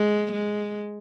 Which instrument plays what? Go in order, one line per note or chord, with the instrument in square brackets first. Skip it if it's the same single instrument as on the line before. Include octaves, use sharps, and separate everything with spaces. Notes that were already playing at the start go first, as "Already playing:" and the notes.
Already playing: [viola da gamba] G#3
G#3